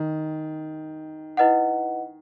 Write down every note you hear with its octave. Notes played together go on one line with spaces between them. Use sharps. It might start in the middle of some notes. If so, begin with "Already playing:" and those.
Already playing: D#3
E4 B4 D#5 F#5